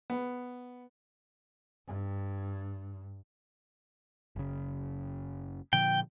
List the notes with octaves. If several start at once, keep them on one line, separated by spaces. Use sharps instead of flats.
B3
G2
F#1 C#3
A#2 D3 F3 G5